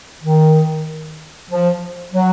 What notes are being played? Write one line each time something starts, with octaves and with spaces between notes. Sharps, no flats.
D#3
F3
F#3